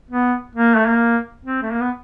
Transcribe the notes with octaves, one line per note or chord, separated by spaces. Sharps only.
B3
A#3
A3
A#3
C4
A3
A#3
B3